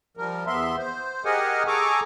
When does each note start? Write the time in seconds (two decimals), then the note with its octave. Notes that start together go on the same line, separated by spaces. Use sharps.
0.17 F3 G3 A#4
0.47 E2 B3 E5 C6
0.77 C5
1.25 G4 G#4 A#4 D#5 F#5 G#5
1.67 G#4 A4 G#5 A#5 C#6 D6